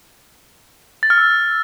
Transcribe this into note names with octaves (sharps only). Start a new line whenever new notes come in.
A6
F6
E6